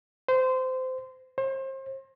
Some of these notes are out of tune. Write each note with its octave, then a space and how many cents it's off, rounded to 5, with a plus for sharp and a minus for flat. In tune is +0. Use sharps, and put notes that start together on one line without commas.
C5 -20
C5 +35